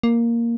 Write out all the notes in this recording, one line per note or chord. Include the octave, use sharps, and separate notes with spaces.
A#3